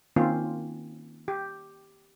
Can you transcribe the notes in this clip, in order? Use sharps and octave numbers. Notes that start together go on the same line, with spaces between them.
D#3 A#3 C4 C#4 F4
G4